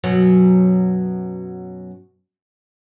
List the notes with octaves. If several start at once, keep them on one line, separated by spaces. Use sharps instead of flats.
F#2 B2 F#3